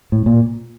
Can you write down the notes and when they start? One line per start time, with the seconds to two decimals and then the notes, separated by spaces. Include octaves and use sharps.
0.12 A2
0.26 A#2